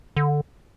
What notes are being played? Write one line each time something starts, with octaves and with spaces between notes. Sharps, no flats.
D3